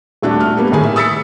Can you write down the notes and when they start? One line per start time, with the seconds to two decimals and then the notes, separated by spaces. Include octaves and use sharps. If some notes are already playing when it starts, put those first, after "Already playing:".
0.22 D#1 A3 D4 F#4
0.40 F6
0.57 G3 A#3 B3
0.72 A2 D#3 A#3 G#4 G#5
0.83 E5
0.96 D#6 E6 A6 B6 C#7